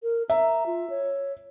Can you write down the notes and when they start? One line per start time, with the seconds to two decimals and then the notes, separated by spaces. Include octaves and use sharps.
0.03 A#4
0.30 E5 A#5
0.66 F4
0.90 C#5